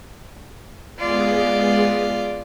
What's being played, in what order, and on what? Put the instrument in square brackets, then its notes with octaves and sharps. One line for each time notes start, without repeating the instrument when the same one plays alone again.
[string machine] G#3 B3 G#4 [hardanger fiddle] F4 D5